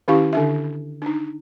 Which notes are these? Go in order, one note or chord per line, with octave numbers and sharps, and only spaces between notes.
D#3 C#4 E4 G4 F5 C#6
D3 D4 E5
D4 D#4